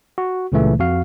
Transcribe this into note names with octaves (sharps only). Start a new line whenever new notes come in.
F#4
C#2 A#2 C#3 E3 A3
F2 F#4 F5